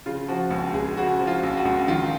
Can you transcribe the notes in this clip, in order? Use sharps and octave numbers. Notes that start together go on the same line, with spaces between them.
C#3 F4
F3 F#4
C#2
C#2 G#4
C#3 F#4
F3
F4
C#2
F#4
C#2
D#3 F4